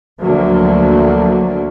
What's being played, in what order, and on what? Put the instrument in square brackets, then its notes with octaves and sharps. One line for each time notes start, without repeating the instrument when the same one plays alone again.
[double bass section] D2 D3 F3 F#3 A3 A#3